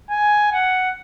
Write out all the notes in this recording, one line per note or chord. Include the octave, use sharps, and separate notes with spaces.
G#5
F#5